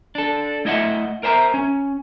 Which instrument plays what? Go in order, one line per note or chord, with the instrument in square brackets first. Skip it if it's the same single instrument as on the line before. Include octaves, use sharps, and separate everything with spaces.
[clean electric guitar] D4 A4
A3 E4 D#5 E5 F#5
A#4 C5 E5 A5 A#5
C#4